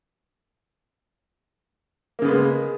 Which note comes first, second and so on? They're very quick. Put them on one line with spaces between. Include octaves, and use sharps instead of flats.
A#3 C#3 B3 G#3